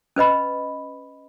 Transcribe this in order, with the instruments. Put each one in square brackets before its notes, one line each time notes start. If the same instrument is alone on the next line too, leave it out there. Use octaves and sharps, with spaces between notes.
[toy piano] C#4 B4 D#5 B5